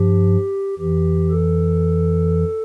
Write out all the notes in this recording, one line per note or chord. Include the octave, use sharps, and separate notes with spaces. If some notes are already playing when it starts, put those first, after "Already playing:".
Already playing: G2 F3 G4
F2 E3 G4
A4